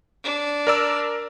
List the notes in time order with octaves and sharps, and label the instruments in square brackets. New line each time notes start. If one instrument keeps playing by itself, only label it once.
[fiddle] D4
[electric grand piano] A#4 D5 E6